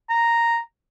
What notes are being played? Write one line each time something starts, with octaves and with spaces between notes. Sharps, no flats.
A#5